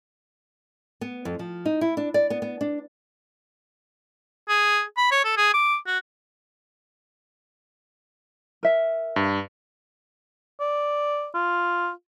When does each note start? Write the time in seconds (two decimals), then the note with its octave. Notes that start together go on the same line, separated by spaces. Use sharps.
1.01 B3
1.25 F2
1.39 F3
1.66 D#4
1.81 E4
1.97 D4
2.14 D5
2.30 B3
2.42 B3
2.61 D4
4.48 G#4
4.97 B5
5.11 C#5
5.24 A4
5.37 G#4
5.54 D6
5.86 F#4
8.63 A#4 E5
9.16 G2
10.60 D5
11.35 F4